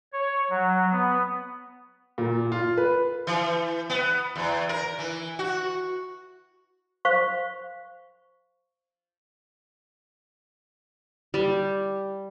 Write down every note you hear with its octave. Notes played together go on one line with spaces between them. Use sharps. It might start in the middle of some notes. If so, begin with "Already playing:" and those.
C#5
F#3
B3
A#2
F4
B4
E3
B3
E2
A#4
E3
F#4
C5 F5 C#6
G3